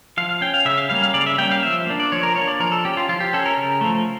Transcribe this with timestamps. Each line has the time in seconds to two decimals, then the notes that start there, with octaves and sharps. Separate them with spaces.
0.17 F3 F5
0.29 F5
0.41 C#4 G5
0.54 F5
0.65 C#3 E5
0.77 F5
0.90 G3 A#3 C#4 F5
1.02 F5
1.14 C#3 D5
1.26 E5
1.38 G3 A#3 C#4 G5
1.51 F5
1.63 F3 E5
1.87 A#3 D4
2.00 D5
2.12 F3 C#5
2.23 A#4
2.35 A#3 D4 C#5
2.47 D5
2.60 F3 A#4
2.72 A4
2.85 C#4 G4
2.97 F4
3.09 F3 F4
3.20 G4
3.33 C#4 A4
3.46 A#4
3.57 C#3
3.81 F3 A3